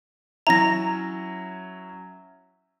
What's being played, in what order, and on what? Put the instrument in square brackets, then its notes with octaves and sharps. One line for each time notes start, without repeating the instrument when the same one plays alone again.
[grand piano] F#3 C#4 E4 [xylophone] A#5 A#6